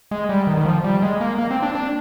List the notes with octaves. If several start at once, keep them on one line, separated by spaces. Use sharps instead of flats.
G#3
G3
D#3
D#3
F3
G3
G#3
A#3
A#3
C4
D4
D4